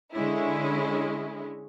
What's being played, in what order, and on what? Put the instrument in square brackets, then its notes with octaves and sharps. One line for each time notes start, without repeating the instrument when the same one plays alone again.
[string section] D3 G#3 C#4 E4